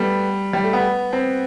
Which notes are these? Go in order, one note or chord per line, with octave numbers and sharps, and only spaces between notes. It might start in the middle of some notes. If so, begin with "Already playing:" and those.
Already playing: G3 A3 B3
G3
A3
B3
C4